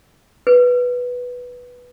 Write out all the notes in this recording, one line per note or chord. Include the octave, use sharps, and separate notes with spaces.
B4